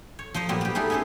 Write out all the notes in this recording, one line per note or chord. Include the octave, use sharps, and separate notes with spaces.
C#5
F3 C5 D#5 A#5
A#2 F#3 G3 B3 C4
B3 G4
G3 A3 B3 D#4 G#4
B3 C#4 E4 A4 C5